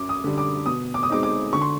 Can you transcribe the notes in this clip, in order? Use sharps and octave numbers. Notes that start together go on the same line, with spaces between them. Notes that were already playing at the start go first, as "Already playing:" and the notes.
Already playing: F#2 D6
D#6
D3 G3
D6
B2 D#6
D6
D#6
G#3 C4 D#4 D6
D6
D3 C#6
C6